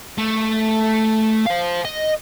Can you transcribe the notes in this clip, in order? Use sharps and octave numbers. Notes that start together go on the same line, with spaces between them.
A3
C5 F5
D#5